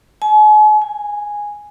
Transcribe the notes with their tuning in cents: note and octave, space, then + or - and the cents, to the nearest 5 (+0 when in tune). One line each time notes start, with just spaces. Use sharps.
G#5 +45
G#5 -5